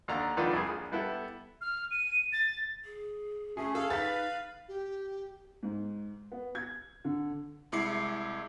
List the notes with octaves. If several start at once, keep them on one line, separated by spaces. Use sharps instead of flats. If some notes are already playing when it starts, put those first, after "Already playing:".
D#2 D3 D5 A#5
C#2 D3 D#3 F3 B4 D5
C2 G#4
A#1
G3 B3 E4 A4
F6
D#7
A6
G#4
A3 C#4 G#4
G#4 A4 F5
D#4 B4 A6 B6
G4
G#2
B3
G#6
D3
C2 G#3 E4 D6 C7 C#7